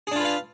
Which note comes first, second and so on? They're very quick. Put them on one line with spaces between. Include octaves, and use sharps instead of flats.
G#4 D4 F4 B4 F5